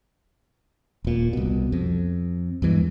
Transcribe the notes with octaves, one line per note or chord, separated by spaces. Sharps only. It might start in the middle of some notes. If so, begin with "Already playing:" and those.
D#1 A#2
C2 B2
F2
E2 G2 E3 G#3